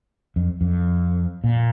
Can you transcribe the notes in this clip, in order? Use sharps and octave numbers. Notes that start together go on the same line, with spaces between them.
F2
F2
A#2